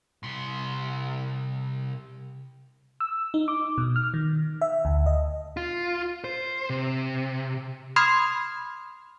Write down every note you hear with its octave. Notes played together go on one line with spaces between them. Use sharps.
C2 C6
E6
D#4
D6
B2
F6
D#3
E5
D2
D#5
F4
C5
C3
B5 C6 D#6 F6 G#6 C7